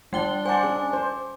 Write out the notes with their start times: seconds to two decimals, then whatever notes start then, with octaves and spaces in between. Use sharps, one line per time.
0.13 G3 D4 G5 G7
0.45 C5 F#5 G#5 A5 D6
0.63 C#4 G#4
0.93 C5